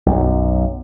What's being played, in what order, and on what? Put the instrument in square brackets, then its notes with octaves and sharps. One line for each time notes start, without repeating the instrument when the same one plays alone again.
[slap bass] B1 F#2